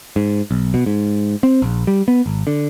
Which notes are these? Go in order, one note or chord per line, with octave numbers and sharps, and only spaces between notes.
G#2
B1
B2
G#2
C4
A#1
G3
B3
G#1
D3